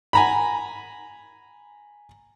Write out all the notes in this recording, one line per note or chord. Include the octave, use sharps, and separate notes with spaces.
G#5 A#5 B5